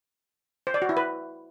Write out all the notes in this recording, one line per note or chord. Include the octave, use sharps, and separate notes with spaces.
C5
D5
F#4
E4
B4